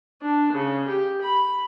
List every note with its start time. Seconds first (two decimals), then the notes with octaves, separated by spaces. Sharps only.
0.21 D4
0.52 C#3
0.87 G4
1.22 B5